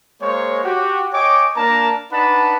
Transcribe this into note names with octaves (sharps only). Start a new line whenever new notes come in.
G#3 A#3 C5 C#5
F#4 G4
C#5 D#5 G5 G#5 D6
A#3 D4 A#4 A5 A#5
D4 D#4 B4 F#5 A5 B5